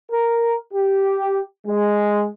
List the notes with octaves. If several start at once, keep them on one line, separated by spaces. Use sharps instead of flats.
A#4
G4
G#3